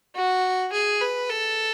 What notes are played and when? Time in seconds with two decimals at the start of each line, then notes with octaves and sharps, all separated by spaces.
0.16 F#4
0.72 G#4
1.01 B4
1.30 A4